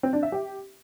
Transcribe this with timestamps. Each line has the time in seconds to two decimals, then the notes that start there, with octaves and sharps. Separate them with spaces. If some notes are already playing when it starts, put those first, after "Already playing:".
0.03 C4
0.13 D4
0.23 E5
0.32 G4